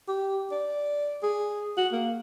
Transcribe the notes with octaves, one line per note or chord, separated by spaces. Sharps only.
G4
D5
G#4
F#4
A#3